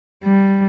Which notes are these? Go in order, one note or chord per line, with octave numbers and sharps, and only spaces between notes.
G3